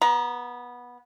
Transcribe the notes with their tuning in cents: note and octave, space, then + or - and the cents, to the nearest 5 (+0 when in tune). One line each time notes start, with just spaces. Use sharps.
B3 -15 A#5 +25